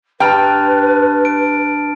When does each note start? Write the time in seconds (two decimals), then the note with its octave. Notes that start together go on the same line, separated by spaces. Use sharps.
0.20 G2 B4 G5 A5 A#5 F6 A6
1.25 D7